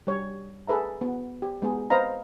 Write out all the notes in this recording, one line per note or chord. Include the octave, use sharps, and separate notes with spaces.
G3 C#5
G#4 A4 B4 E5 A#5
B3
G4
G#3 B3 G#4
C4 B4 C5 D#5 F5 A#5